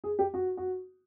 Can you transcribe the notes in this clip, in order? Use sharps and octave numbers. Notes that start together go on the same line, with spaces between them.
G#4
G4
F#4
F#4